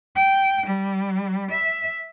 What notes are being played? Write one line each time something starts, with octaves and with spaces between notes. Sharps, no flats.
G5
G3
E5